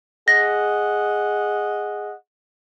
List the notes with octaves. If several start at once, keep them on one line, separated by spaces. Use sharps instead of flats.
G#4 D#5 F#5 A#6